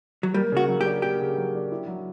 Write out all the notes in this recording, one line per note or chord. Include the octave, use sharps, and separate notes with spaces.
F#3
G3 A#3
C#3 F#4
F#3
G4
D4
A#3 G4
C#3
F#3
D4
E4
F#3